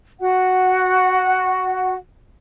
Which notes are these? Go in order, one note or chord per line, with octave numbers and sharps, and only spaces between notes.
F#4 F#5